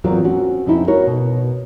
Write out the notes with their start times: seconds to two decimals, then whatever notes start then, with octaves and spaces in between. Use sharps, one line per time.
0.04 E2 A2 F#3 C4 F4 A#4
0.24 C4 C#4 F#4
0.66 F2 C4 C#4 D#4 E4
0.87 F#4 A#4 C#5
1.07 B2